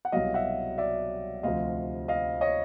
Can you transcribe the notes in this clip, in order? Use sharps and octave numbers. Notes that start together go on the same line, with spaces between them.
F#5
C2 B2 F#3 D#5 F5
E5 F#5
D5 E5
D2 C3 F3 D#5 F5
D#5 F5
C#5 D#5